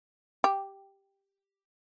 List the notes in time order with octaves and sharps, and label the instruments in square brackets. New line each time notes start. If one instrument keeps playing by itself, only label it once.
[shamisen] G4